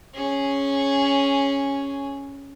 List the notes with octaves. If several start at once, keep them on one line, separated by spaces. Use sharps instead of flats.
C#4 G#4